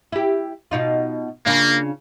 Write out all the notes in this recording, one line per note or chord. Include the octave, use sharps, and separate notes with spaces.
E4 G4
B2 D#4 F4
C#3 A#3 D4 F4